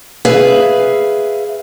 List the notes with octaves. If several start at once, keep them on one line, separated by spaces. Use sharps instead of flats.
G#4 B4 E5 F5